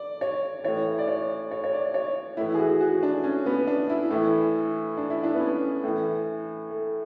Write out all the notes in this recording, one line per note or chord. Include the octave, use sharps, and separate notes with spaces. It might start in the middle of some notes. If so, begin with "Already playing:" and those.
Already playing: D5
C#5
A2 E3 C#5
D5
C#5
C#5
C#5
D5
C#5
A2 E3 E4
G#4
F#4
F#4
D4
C#4
B3
D4
E4
A2 E3
D4
E4
D4
B3
C#4
A2 E3
A3